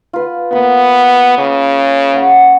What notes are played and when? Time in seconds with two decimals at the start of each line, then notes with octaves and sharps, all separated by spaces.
0.13 F4 B4
0.52 A#3 B3 B5 D#6
1.38 C#3 D6
2.14 C#4 F#5 C#6